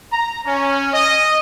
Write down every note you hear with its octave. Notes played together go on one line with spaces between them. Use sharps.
A#5
C#4
D#5